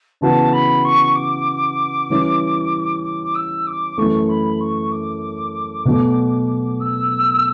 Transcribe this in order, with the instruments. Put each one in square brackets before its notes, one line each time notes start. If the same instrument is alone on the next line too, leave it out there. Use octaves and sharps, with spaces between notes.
[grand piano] C#3 E3 B3 F#4 [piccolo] A5
[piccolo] B5
C#6
D6
[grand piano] E3 G3 C#4 E4
[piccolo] D6
D6
E6
D6
[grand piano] F#2 E3 A3 [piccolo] C#6
[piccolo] B5
C#6
D6
[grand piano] B2 F#3 A3
[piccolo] E6